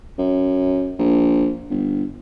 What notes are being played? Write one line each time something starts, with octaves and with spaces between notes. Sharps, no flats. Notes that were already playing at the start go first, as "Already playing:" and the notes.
F#2
A#1
G1